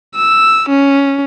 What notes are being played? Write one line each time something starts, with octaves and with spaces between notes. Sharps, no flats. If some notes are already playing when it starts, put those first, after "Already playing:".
E6
C#4